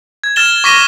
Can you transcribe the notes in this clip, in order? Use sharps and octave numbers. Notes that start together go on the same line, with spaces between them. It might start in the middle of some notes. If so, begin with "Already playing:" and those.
G#6
F6 A6 E7 G7
C#6 D6 A#6 B6 D#7 G7